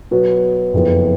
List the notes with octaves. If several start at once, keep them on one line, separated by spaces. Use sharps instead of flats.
B2 F#3 B3
F#1 F2 F3 B3